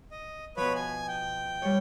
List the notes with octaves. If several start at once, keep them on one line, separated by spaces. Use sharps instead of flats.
D#5
B2 F3 B4 C#5 B5
G#5
G5
G3 C#5